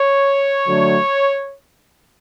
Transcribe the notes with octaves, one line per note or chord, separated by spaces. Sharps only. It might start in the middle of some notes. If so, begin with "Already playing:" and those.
Already playing: C#5
D3 F#3 A3